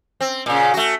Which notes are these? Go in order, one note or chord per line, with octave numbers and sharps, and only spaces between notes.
C4
A#2 C#3
A3 F#4